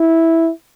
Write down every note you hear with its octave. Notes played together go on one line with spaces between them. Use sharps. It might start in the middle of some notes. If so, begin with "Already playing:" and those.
Already playing: E4